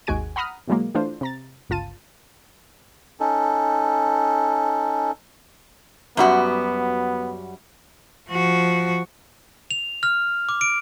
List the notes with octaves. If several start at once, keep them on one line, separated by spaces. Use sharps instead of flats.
G#1 D#2 G#3 F#4 G#5 D7
F#5 A#5 B5 D#6 F6
B2 E3 F#3 G#3 A#3
E3 A3 D4 F4 C5
C3 A#5 A6
G1 C#2 F4 A5 D#7
C#4 D#4 A4
F#2 G3 B3 F#4
F3 F#4
F7
F6
D6
D7